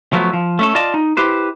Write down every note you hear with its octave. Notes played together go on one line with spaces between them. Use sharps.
F3 F#3 A3 B3
F3
A3 C#4 A4
F4 D5 D#5 A5
D#4
E4 G4 B4 C5